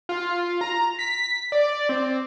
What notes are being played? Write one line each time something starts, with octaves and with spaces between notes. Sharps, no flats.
F4
A#5
B6
D5
C4